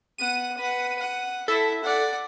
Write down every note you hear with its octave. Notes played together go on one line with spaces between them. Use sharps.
B3 F#5 D#7
B4 F#5
F#5
E4 A4 E5
D5 F#5